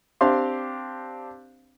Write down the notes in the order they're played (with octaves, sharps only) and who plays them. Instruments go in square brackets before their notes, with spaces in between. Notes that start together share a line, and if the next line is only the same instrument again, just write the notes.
[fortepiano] C4 D4 G4 F5 C6